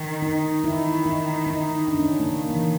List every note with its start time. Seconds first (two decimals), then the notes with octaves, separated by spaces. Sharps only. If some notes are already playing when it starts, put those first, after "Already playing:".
Already playing: D#3
0.22 D#4
0.64 D#3 E4
1.06 D#4
1.46 D#4
1.88 D#3 D4
1.99 C#4
2.19 A#3
2.30 A#3
2.50 E3